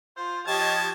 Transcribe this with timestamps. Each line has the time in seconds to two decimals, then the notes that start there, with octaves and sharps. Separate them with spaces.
0.17 F4 C5
0.47 F3 G4 C#5 D#5 A5 G#6